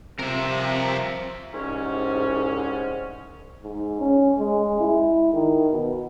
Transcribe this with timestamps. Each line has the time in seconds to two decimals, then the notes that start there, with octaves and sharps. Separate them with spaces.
0.19 C3 F3 A#4 E5
1.53 C2 G#2 C#4
3.62 G#2
3.99 C#4
4.38 G#3
4.80 E4
5.33 D#3
5.70 B2